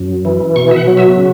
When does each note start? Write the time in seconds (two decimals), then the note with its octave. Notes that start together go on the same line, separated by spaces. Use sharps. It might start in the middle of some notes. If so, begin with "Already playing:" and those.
Already playing: F#2
0.25 E3
0.56 B2 C#6
0.71 E5
0.76 F#5
0.87 F#3
0.97 E5
1.17 C#3